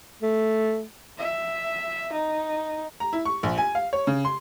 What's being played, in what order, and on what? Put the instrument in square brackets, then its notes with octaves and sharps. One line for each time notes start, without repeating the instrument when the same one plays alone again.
[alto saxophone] A3
[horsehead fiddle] E5
D#4
[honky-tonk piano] A#5
E4
C#6
A#1
G#5
F5
C#5
C#3
C6